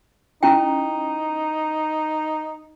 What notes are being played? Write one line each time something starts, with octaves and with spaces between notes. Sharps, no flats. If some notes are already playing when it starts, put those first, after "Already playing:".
C#4 D#4 E4 G5